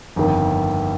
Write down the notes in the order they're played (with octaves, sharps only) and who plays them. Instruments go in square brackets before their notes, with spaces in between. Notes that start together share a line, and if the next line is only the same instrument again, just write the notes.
[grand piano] G1 F2 D#3